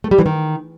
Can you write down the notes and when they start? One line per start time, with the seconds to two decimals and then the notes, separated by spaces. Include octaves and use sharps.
0.04 A3
0.11 G3
0.19 E3
0.26 D#3